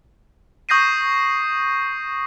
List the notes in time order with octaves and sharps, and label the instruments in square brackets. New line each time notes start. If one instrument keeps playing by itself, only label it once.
[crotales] C#6 D#6 G6 A#6 C7 D#7